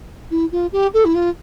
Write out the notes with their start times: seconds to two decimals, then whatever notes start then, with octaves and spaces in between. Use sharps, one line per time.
0.31 E4
0.52 F4
0.72 G4
0.94 A4
1.05 E4
1.15 F4